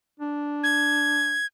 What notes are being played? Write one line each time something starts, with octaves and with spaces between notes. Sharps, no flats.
D4
G#6